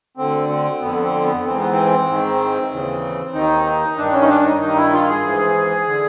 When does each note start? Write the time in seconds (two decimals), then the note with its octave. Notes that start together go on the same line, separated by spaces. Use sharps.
0.17 D2 D3 C4
0.50 C4
0.80 F2 D3 B3
1.02 C4
1.23 B3
1.44 G#2 E3 C4
1.58 B3
1.72 C4
2.08 G#2 D#3
2.71 D#2 C#3 E3
3.34 D#2 D#3 D#4
3.98 G2 D#3 D4
4.12 C#4
4.22 D#4
4.28 D4
4.44 D#4
4.60 G2 D#3 D#4
4.77 E4
4.93 F4
5.09 G#4
5.23 G#2 E3
5.86 D3